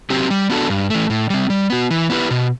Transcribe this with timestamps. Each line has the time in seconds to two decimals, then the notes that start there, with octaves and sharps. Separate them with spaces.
0.10 F#3 C4 G4
0.30 G3
0.50 B3 D4 F#4 A4
0.70 G2
0.90 E3 A3
1.10 A2
1.30 G3 C4
1.50 G3
1.70 B3 F#4
1.90 E3
2.10 B3 E4 G4 B4
2.30 B2